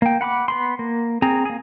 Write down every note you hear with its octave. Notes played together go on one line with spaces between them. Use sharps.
A#3 G5
F#5 B5 C6 D6
B3 B5 C6
A#3
C4 G#4 A#5
A#3 G#4